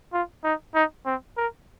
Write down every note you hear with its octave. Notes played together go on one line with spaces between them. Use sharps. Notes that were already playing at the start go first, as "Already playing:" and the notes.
F4
D#4
D#4
C4
A#4